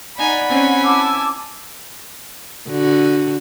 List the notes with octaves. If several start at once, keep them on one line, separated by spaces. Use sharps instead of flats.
D#4 D5 F#5 G#5 B5
C4 C#4 D#4 G#5
E4 A5 D6 E6
D3 F#4